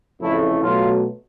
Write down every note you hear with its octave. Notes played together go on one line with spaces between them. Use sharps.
F2 C#3 E3 A3 E4
B2 F#3 A3 F4